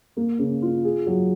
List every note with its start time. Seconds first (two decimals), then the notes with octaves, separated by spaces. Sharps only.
0.17 A#3
0.39 C#3
0.62 F4
0.84 G#4
1.06 F#3